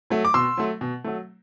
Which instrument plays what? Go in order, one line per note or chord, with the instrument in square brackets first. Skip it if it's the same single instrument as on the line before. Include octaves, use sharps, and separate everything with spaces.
[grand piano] F#3 A3
D6
B2 C6 E6
F#3 A3
B2
F#3 A3